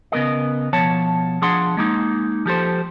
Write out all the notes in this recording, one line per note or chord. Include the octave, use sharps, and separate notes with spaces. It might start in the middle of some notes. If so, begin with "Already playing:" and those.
C#3 B3 A#4 D#5
B2 F3 C#5 A5
F3 D4 G#4 F#5 C6
G#3 A#3 D#4
F3 G4 A4 C5